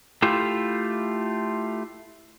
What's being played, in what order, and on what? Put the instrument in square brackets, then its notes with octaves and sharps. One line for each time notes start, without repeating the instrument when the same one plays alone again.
[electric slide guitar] A3 E4 F4 G4